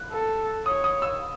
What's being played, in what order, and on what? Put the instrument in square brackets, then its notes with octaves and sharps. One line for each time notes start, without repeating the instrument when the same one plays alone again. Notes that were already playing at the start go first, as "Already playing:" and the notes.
Already playing: [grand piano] F#6
[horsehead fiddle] A4
[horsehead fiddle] C#5 [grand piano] D#6
[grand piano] D#6
E6